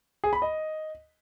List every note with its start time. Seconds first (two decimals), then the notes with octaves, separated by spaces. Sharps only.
0.24 G#4
0.33 B5
0.42 D#5